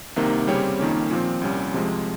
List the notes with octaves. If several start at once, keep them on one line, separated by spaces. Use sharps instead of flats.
C2 C3 D#3 A#3
C#3 G3 C4 G4 C#5
F2 D#3 A#3 C#4
A#2 F3 C4
C2 A#2 G3 C#4
F2 C3 F3 G#3